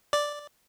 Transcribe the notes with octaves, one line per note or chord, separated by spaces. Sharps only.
D5